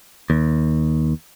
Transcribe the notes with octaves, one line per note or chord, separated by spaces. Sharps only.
D#2